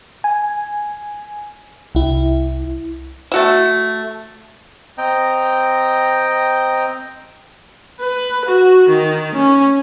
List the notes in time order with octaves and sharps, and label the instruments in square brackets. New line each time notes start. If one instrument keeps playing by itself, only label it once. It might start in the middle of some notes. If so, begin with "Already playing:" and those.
[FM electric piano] G#5
C2 E4
[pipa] A3 F#4 E5
[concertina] C4 D#5 G5 A#5
[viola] B4
F#4
D#3
C#4